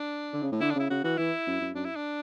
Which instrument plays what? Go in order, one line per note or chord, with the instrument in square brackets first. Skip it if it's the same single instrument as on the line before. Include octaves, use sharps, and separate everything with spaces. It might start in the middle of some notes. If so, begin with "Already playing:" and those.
Already playing: [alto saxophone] D4
[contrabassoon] D3
C#3
A2
[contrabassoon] D3 [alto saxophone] E4
[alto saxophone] D4
[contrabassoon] C#3 [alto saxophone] E4
[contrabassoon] C#3 [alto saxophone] F#4
[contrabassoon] E3 [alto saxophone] F#4
[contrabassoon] E3 [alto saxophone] E4
[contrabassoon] F#2
F#2
[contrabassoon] F#2 [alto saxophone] D4
[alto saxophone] E4
D4